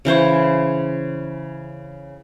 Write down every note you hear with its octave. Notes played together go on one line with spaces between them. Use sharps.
C#3 E3 C5 C#5